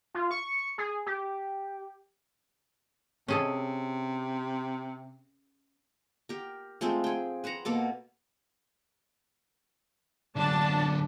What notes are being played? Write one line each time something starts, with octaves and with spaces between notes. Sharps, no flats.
F4
C#6
G#4
G4
C3 C#4 G#4 A4
G4 A#4
F3 G#3 A3 C4
G#4 G5
B4 C5 F#5 A#5
B2 A#3 A4 D6
F#2 D3 D4 A5